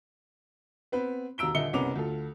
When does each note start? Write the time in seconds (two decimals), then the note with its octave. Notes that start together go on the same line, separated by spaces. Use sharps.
0.92 B3 C4 B4
1.38 D#2 B2 A#5 E6 D7 G7
1.54 D#1 D3 D#5 E5 C#7 G7
1.73 F#1 C2 B3 C#4 D6 F7
1.95 D2 F4 A4